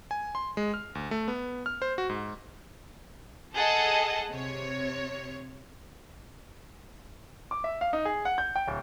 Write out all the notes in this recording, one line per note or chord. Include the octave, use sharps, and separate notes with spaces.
G#5
C6
G#3
F6
D2
A3
B3
F6
C5
F#4
G#2
G#4 A4 D#5 F#5 A5
C3 C#5
D6
E5
F5
D#4
G#4
F#5
G6
G5
D1